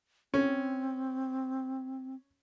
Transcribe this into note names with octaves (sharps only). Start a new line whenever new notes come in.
C4 C#4